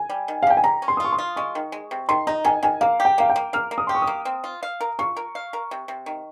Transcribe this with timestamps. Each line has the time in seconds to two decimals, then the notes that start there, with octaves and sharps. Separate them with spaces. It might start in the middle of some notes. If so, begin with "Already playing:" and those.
Already playing: G#5
0.09 G3
0.28 D#3
0.43 F5
0.47 G3 G5
0.57 G#5
0.64 G3 A#5
0.82 C#4
0.88 C6
0.97 D#6
1.00 F4 C#6
1.12 C6
1.18 F4
1.36 G#3 C#6
1.55 D#3
1.72 G#3
1.91 C3
2.09 D#3 C6
2.27 D#4 A#5
2.44 D#3 G#5
2.63 D#3 G#5
2.81 A#3 F5
3.00 G4
3.05 G5
3.18 A#3 F5
3.30 G5
3.36 A#3
3.53 A#3 F6
3.71 A#3
3.78 D#6
3.87 G4 C6
3.95 C#6
4.02 D#6
4.07 A#3
4.25 C4
4.44 F4
4.63 F5
4.81 A#4
4.99 F4 C#6
5.17 A#4
5.35 F5
5.53 A#4
5.71 C3
5.88 C3
6.06 D#3